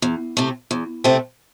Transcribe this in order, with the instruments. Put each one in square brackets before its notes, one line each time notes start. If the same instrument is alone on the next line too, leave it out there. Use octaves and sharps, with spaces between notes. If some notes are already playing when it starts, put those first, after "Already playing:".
[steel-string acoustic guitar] E2
C3 A3 C4
E2
C3 A3 C4